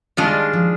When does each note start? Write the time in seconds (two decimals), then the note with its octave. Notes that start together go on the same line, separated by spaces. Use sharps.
0.17 D#3 G3 G#3 D4 F4
0.53 F3